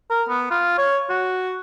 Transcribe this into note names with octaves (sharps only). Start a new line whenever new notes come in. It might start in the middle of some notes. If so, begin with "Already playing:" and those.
A#4
B3
F4
C#5
F#4